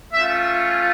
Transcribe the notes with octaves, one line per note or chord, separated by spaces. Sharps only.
A3 C#4 F4 E5